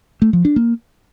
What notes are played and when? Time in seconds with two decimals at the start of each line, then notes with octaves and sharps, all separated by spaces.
0.22 A3
0.33 F3
0.45 D4
0.56 A#3